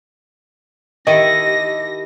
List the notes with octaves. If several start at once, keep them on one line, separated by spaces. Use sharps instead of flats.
D#3 E4 G4 A4 D#5 A#6